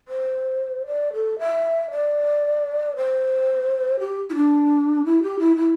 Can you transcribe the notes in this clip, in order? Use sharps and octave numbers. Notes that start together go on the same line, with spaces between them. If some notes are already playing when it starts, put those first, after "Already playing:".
C5
D5
A4
E5
D5
C5
G4
E4
D4
E4
G4
E4
E4